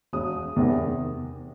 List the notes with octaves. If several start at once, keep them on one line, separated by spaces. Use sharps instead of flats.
E1 D#6
E2 C3 D#3